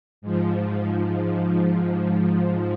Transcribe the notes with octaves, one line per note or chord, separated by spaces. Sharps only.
G#2 F3